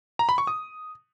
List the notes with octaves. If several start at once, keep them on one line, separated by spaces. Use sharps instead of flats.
A#5
B5
C#6
D#6